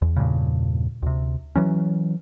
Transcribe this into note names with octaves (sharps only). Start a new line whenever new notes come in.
E2
E2 G2 A#2 C#3
D2 C3
E3 F#3 C#4